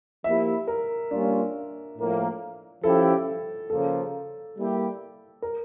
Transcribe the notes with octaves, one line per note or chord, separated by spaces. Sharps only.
F3 A#3 E4 G4 E5
A#4
G3 A#3 C#4 D4 F4
A2 F3 A#3
F3 C#4 E4 G4 A4
C#3 F3 A#3 A4
G3 A#3 E4 G4
A#4